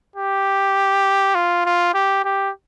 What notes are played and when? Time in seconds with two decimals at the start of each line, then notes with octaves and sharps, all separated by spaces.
0.16 G4
1.35 F4
1.65 F4
1.94 G4
2.25 G4